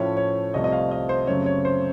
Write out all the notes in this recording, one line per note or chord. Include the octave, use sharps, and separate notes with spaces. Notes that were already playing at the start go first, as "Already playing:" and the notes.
Already playing: A2 F3 A3 C#4 C#5
C#5
C2 C3 F3 A3 C4 D#5
D#5
F5
D#5
C5
F#2 C#3 A3 C4 C#5
C#5
C5